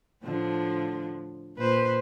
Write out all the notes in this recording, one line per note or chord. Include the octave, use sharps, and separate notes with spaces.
A2 D3 F3
A#2 B4 C5